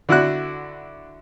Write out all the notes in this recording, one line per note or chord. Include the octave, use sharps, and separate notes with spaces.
D3 E4 F#4 F#6